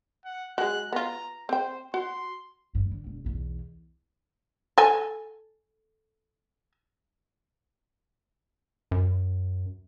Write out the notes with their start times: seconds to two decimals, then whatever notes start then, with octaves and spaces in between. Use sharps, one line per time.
0.25 F#5
0.58 F#3 G#3 F#6
0.92 B3 F4 A#5
1.49 C4 C5 G5
1.94 F#4 C6
2.75 G2
2.91 D3
3.06 E1
3.25 B1 E2
4.78 A4 G#5
8.91 F#2